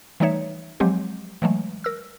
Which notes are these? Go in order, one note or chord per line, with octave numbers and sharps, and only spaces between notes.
E3 G3 A3 D#4 C#5 E5
F3 F#3 G#3 C4 G4
E3 F#3 G#3 A3
A#4 E6